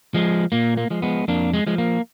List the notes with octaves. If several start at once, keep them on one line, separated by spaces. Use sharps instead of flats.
F3 G#3
A#2 A#3
A#3
F3 G#3
G#3 B3
F2 A#3 D4
G#3
F3 G#3
A#3